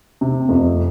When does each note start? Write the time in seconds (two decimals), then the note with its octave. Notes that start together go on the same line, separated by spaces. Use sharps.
0.21 C3
0.49 F2